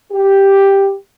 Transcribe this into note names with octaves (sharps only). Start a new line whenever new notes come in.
G4